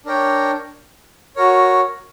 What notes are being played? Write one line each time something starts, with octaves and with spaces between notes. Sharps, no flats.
D4 A#4 C#5 G5
F#4 A#4 C#5